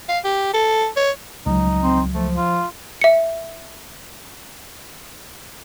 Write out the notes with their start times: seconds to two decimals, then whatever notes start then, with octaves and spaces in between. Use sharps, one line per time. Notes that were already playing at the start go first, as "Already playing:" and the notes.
0.09 F5
0.24 G4
0.54 A4
0.97 C#5
1.46 C#2 F#3 D#4
1.82 C4
2.14 F3 A3
2.37 F4
3.01 E5 C#7